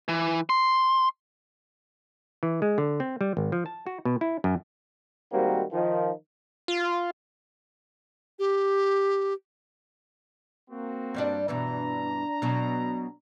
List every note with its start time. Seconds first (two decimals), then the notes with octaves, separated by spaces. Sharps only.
0.08 E3
0.50 C6
2.43 E3
2.62 G#3
2.78 D3
3.00 C4
3.21 G3
3.37 G#1
3.52 F3
3.66 A5
3.86 F#4
4.05 B2
4.21 E4
4.44 F#2
5.32 G#2 D#3 G3 A#3 C4 F#4
5.73 D#3 F3 D#4
6.68 F4
8.39 G4
10.70 A#3 C4 F#4
11.14 G2 G3 D4
11.48 G2 B2 E3 D4 A#5
12.42 B2 F#3